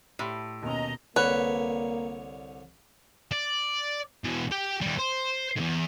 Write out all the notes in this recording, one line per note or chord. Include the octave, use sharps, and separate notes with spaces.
A2 G4 B5 C6
D#2 B2 C#4 D#5 A#5
C2 D3 A#3 B4 C#5
D5
B2 E3
G4 G5
D#2 G3
C5
E2 G#2